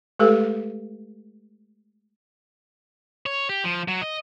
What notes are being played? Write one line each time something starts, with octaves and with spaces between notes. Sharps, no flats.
G#3 A3 G4 A4 B4
C#5
G4
F3
F#3
D#5